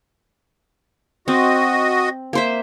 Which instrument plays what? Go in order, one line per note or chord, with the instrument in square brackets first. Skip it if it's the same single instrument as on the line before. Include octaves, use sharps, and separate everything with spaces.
[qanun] C4 [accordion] F#4 D#5
[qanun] A#3 C5 E5